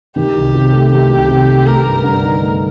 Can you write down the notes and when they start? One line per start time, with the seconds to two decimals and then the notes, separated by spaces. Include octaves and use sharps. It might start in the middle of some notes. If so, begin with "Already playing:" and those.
0.16 D#3 G4
0.35 C2
0.54 C3
0.73 A3
0.91 D#3 G4
1.10 C2
1.28 C3
1.48 A3
1.66 A3 A#4
1.85 G2
2.04 D3
2.23 D#4
2.42 A3